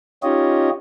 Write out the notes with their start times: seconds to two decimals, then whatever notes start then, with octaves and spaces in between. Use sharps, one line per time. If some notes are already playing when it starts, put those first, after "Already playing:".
0.23 C#4 D#4 F4 G4 C#5 D#5